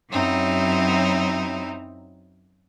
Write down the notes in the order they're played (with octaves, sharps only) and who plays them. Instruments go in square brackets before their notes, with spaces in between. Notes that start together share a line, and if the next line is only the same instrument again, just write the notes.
[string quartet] F#2 F#3 C4 D#4 E4